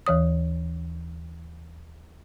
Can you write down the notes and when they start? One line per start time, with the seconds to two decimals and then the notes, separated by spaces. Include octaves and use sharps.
0.07 D#2 E3 C#5 D#6